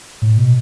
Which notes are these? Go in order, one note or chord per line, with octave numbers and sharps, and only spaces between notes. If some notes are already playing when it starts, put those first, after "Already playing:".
A2
B2